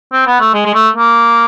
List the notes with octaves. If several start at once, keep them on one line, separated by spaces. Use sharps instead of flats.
C4
B3
A3
G#3
G#3
A3
A#3